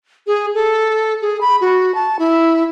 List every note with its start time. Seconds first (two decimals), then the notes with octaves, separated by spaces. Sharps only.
0.27 G#4
0.55 A4
1.22 G#4
1.41 B5
1.61 F#4
1.95 A5
2.19 E4